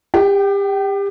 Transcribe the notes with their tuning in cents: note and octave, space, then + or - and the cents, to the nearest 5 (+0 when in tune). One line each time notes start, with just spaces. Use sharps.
G4 +30 G5 -25